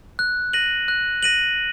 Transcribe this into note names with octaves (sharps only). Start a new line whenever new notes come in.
F#6
A#6 D#7 F#7
F#6
A#6 D#7 F#7